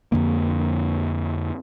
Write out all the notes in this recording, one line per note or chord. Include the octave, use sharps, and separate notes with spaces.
F2 D3 A#3